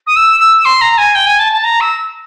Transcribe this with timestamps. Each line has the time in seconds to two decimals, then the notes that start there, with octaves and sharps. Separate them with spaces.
0.06 D#6
0.16 E6
0.40 E6
0.65 C6
0.81 A#5
0.97 G#5
1.15 G5
1.26 G#5
1.39 A5
1.52 A5
1.63 A#5
1.80 E6